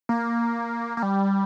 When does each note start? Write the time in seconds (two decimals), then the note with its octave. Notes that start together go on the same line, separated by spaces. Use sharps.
0.09 A#3
0.97 A#3
1.03 G3